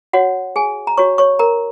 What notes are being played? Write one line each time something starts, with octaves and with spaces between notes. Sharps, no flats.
F#4 C#5 F#5
G#4 G#5
A#5
F#4 C#5 C#6
C#5 C#6
A#4 A#5